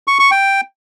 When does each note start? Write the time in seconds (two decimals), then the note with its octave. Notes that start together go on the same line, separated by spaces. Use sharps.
0.08 C#6
0.19 C#6
0.31 G5